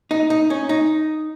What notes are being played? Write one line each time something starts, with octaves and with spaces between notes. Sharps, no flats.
D#4
D#4
C#4
D#4